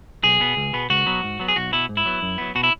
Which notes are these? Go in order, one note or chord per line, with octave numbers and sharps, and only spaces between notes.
B1 G#4
B2 B3
C#2
B2 B3
C#2 F#4
B2 F#3 B3
G#2
F#3 B3
G#4
B1 F#4
B2 B3 E4
G#2
E4
F#3 B3
F#2
F#3 B3
B2 F#4
E4